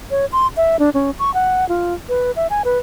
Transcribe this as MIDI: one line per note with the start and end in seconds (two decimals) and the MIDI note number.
0.11 0.26 73
0.32 0.47 84
0.57 0.79 76
0.79 0.90 62
0.94 1.11 61
1.19 1.33 85
1.34 1.67 78
1.69 1.94 65
2.09 2.31 71
2.36 2.47 76
2.50 2.62 80
2.65 2.79 71